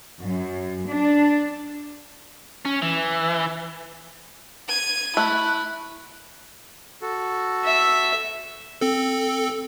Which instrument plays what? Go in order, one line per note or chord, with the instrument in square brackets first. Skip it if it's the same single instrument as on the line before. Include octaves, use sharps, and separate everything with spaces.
[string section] F#2
D4
[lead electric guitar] C#4
E3
[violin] G#6 D#7
[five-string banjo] A3 [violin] E4 [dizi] F#6
[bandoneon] F#4 A4
[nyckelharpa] E5
[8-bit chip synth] C4 A4